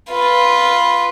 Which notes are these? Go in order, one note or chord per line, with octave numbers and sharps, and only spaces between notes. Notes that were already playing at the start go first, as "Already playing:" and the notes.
F4 B4